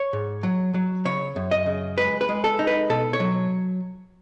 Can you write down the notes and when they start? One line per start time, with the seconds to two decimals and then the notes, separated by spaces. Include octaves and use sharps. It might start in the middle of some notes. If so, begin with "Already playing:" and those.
Already playing: C#5
0.13 G#2
0.43 F#3
0.74 F#3
1.05 C#3 C#5
1.36 F#2
1.51 D#5
1.66 C#3
1.98 G#3 B4
2.21 B4
2.29 G#3
2.44 A4
2.59 D#4
2.67 B4
2.90 B2 A4
3.13 C#5
3.20 F#3